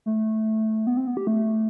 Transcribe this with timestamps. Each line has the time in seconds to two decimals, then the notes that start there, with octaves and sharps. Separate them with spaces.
0.06 A3
0.87 B3
0.97 C4
1.07 B3
1.17 G4
1.27 A3